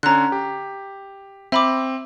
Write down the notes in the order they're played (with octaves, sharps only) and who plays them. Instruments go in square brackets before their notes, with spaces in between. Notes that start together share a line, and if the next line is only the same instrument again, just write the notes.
[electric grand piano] D3 C#4 [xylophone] A#5 F#6
[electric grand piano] G4
[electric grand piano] C4 [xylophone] E5 B5 D6